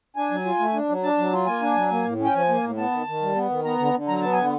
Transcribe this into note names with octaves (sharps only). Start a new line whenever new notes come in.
D4 G#5
F#3
F4
A3
D4
F#3
D4 A5
F#3
F4
A#3 G#5
D4
F#3
A#3
A2
C#4
G5
F3 G#5
A#3
A2
B3 A5
D#3
D#3
G3
B3
D#3
B3 A#5
D3
D3
F#3 A#5
B3 A5
D3 G#5